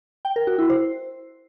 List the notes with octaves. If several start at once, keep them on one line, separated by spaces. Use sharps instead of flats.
G5
A#4
F#4
E4
C5